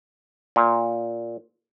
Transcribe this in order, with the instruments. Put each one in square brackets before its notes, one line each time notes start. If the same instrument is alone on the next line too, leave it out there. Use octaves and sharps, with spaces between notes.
[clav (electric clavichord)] A#2